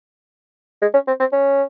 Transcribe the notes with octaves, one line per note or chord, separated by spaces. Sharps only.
G#3
C#4
C4
C4
C#4